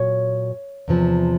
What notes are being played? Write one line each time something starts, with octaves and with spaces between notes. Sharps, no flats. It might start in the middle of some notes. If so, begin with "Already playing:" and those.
Already playing: A#2 F#3 C#5
E2 C3 F3